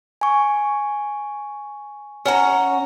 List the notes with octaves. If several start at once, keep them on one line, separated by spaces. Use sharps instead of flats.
G#5 C#6
C#4 F#5 A#5